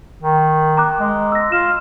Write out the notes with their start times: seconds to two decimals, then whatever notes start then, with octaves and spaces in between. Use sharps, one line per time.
0.22 D#3
0.77 A#5 D6 F#6
0.99 G#3
1.32 E6 A#6
1.52 F4 E7